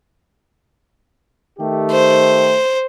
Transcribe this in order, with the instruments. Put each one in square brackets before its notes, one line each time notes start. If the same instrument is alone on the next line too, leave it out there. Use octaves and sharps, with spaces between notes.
[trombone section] D#3 A3 G4
[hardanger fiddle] C5